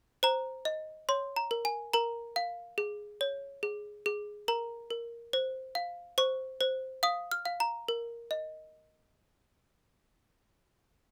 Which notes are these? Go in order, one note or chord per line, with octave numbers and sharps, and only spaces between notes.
C5 A#5
D#5
C#5 C6
A#5
A#4
G#5
A#4 A#5
F5
G#4
C#5
G#4
G#4
A#4 A#5
A#4
C5
F5
C5 C#6
C5
F5 D#6
F6
F5
A#5
A#4
D#5